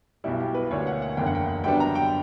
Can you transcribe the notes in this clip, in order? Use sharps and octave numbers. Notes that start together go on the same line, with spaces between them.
B1 B2 G3 E4
G4
B4
D2 D3 A#3 D4 C#5
F#5
F#5
F#1 E2 D3 A#3 G5
F#5
G5
F#2 D3 G3 B3 D4 G5
A#5
G5